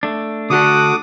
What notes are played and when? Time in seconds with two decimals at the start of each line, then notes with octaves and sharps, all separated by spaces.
0.03 A3 D4
0.50 D3 F#4 A4 D6 D#6